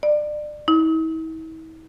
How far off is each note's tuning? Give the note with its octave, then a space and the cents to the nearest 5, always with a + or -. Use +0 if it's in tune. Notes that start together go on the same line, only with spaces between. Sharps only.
D5 +25
E4 -45